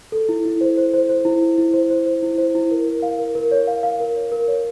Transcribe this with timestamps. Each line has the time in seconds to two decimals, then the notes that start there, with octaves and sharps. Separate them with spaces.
0.12 A4
0.29 E4
0.45 E4
0.61 C5
0.78 C5
0.94 C5
1.09 C5
1.25 E4
1.42 E4
1.58 E4
1.74 C5
1.90 C5
2.06 C5
2.22 E4
2.38 C5
2.55 E4
2.71 A#4
2.87 A#4
3.02 F5
3.19 A#4
3.35 A#4
3.51 C#5
3.67 F5
3.83 F5
4.00 A#4
4.16 C#5
4.32 A#4
4.48 C#5